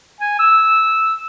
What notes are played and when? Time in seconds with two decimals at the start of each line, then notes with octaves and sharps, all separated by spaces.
0.21 G#5
0.39 E6